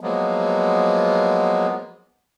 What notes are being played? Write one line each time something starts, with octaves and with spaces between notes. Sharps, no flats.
F3 F#3 G#3 A#3 B3